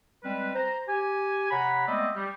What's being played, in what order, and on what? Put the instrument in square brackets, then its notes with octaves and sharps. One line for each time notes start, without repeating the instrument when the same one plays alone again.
[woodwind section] G3 G#3 C4 B4
C5 A#5
G4 G#5
C3 C#5 F#5 A#5 B5
G#3 A3 B3 C4 D5 D#5
G3